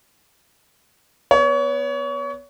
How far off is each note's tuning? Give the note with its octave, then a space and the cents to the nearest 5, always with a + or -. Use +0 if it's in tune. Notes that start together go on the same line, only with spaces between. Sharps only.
B3 +0 C#5 +30